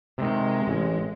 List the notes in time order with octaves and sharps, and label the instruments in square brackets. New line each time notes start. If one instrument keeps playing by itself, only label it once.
[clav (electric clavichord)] C3 D#3 [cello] G#3
[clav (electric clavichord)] A1